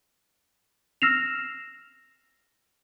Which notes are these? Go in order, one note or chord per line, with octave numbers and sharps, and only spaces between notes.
E6 F6 A#6 C7 E7 F7